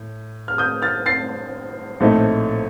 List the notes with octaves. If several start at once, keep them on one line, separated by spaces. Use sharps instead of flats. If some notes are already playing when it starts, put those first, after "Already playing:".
Already playing: A2
F6
D#6 G6
F6 A6
A6 C7
A#1 A2 A3 C4 D#4